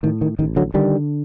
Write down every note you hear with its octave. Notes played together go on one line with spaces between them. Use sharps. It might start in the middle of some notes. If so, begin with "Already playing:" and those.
A2 D#3
D#3
A1 D#3
D3 F#3
D3 D#3 G3